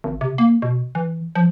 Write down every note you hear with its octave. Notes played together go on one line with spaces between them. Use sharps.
G#1
C3
A#3
B2
E3
F3